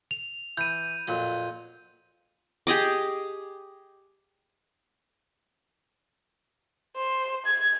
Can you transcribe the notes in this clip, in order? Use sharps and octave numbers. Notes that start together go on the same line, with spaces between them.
F7
E3 G6 D#7
F2 A#2 F#3
G4 G#4 D#5 D6
C5
G#6